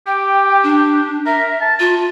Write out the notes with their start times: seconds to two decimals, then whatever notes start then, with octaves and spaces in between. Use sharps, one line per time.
0.07 G4 G5
0.63 D4
1.26 A#4 E5
1.61 A5
1.80 F4